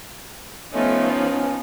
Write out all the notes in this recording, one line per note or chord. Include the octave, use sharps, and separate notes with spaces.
F3 A3 B3 C#4 D#4
C#4